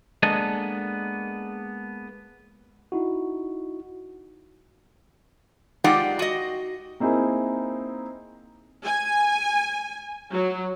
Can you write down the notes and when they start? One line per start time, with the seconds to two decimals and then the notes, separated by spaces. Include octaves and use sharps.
0.23 G#3 A#3 B3 D4 A4 D#5
2.92 D#4 E4 F#4
5.84 G#3 D#4 F4 G4 D5 F#5
6.19 F#4 D#5
7.00 A#3 C4 D#4 E4 G#4 A#4
8.84 G#5
10.32 F#3